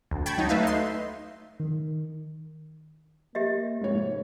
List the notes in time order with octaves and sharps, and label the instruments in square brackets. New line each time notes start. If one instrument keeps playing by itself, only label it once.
[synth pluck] D2
G5 A5 B5 C#6 G#6
F#3 D#4
A3 B4 E5 F5
D#4 C6
[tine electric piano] D#3
[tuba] A#3 [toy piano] G4 D#5 E5
[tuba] F1 [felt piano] G#2 C#5